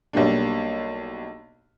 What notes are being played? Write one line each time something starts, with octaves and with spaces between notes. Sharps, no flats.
B1 G3 A#3 D4